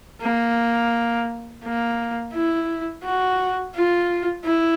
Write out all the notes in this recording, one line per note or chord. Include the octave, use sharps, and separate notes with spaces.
A#3
A#3
E4
F#4
F4
E4